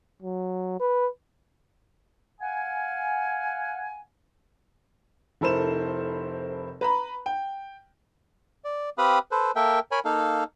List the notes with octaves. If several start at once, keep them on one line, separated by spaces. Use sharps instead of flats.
F#3
B4
F5 F#5 G#5
F1 E4 A4 A#4 C5 E7
B4 A#5 B5
G5
D5
C4 G4 B4 F5 B5 D#6
A4 B4 C5
A#3 A4 A#4 E5 G5
A#4 C#5 G#5 B5
A#3 D#4 A4 F5